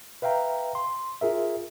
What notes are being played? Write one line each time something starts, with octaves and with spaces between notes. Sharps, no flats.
B4 E5 F5 G5 A#5
C6
F4 G#4 A#4 E5